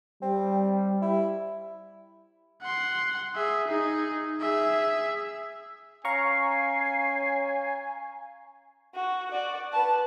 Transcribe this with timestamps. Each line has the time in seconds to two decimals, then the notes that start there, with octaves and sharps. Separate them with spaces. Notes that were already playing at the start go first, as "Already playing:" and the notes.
0.22 G3 C4
1.02 E4
2.62 F#5 C6
3.35 G#4 E5
3.68 D#4 G#4
4.41 G#4 E5
6.05 C#4 F5 G#5 A#5 C#6 C7
8.95 F#4
9.31 F#4 D5
9.73 B4 A5